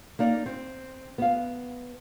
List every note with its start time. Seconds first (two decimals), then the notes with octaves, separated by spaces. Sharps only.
0.19 A#3 D#4 D5
0.46 C4
1.18 B3 F5